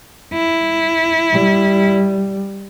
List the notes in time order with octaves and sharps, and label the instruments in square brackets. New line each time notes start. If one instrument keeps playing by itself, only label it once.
[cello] E4
[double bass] G3